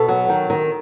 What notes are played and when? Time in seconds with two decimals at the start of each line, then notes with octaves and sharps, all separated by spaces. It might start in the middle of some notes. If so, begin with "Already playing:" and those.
Already playing: B2 A4
0.08 F#3
0.29 D#3
0.50 D#3